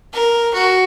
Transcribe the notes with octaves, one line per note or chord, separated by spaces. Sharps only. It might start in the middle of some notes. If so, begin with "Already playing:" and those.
A#4
F#4